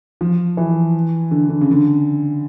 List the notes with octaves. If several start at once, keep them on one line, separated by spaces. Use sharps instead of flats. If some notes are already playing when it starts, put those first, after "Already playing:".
F3
E3
D3
D3
C#3
D3